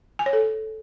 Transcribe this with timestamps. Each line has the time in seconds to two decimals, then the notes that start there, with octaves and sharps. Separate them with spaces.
0.19 G#5
0.26 C#5
0.33 A4